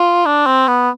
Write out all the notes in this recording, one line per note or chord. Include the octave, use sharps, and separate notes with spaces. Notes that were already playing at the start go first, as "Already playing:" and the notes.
Already playing: F4
D4
C4
B3